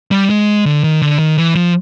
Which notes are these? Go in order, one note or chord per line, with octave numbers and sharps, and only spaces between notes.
G3
G#3
D3
D#3
D3
D#3
E3
F3